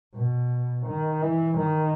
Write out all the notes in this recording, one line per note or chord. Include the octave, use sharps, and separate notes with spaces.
B2
D#3
E3
D#3